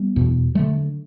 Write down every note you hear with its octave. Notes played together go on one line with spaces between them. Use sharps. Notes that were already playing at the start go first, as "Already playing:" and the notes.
Already playing: G3 B3
E2 B2
D3 F#3 A3